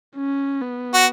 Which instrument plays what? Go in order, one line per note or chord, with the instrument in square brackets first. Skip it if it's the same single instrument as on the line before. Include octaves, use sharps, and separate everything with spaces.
[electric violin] C#4
B3
[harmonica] F#4